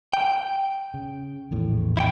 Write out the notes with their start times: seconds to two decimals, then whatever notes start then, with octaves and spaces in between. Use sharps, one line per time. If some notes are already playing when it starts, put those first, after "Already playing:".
0.13 G5
0.94 C#3
1.51 A#1 E2 A2
1.97 E4 G5